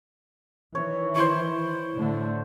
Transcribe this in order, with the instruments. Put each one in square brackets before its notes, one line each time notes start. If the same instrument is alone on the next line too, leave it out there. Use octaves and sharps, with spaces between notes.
[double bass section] D#3 E3 [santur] C#5
[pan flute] E4 [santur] C5 C6 C#6
[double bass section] A2 D3 A3